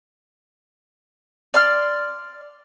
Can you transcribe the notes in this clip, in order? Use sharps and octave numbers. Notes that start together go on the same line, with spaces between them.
D5 C6 F6